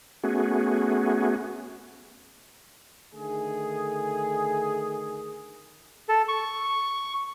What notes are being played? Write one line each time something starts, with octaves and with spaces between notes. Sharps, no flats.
A3 B3 C#4 F#4 G#4
D3 D#3 A3 G#4
A4
C#6